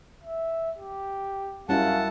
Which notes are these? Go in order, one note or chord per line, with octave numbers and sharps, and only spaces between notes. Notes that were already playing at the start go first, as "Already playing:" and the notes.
E5
G4
F#2 G3 C#4 E4 F5 F#5 A5